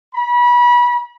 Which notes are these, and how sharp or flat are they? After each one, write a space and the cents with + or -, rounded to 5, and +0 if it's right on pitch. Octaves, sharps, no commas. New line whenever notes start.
B5 -30